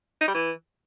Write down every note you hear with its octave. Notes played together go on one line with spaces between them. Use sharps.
D#4
G3
E3